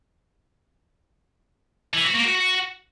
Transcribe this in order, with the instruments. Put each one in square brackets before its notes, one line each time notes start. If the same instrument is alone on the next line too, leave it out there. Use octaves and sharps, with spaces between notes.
[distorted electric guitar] E3
F#4
A#3
F#4
F#4